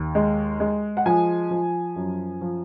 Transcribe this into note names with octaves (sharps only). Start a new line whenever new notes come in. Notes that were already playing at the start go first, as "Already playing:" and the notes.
Already playing: D#2
G#3
G#3
F#5
F3 G#5
F3
F#2
F3